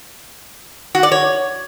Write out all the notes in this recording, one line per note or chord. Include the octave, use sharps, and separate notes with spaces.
F#4
D5
C#5